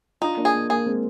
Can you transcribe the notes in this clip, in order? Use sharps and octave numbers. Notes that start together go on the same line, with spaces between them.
D4 D#4 F4
A#3 D4
G#4
A#3
A#3 G#4
G#3 C4